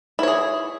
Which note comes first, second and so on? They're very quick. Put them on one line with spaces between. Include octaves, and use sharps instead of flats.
E4 C#5 G#4